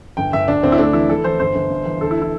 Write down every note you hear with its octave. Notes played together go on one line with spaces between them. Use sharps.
G1 G5
G1 E5
D2 D4
D2 C4
E4
A3 D4
E3 E4
E3 A4
E3 C5
G1 C5
G1
G2
E3
D2 A4
E4
E4